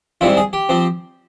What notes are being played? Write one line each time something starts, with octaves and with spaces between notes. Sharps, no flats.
G#2 G3 C4 E4 F4
G#4
G4
F3 C4